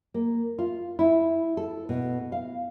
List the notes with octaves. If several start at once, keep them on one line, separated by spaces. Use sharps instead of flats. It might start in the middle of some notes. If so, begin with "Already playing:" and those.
A#3
F4
E4
A4
B2
F5